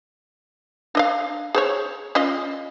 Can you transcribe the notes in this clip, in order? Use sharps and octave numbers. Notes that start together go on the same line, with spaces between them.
D4 D#5 F5
G#4 C5 C#5
C#4 F4 D#5